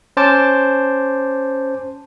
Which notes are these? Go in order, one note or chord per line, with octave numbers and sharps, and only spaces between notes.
C#4 C5 A5 D6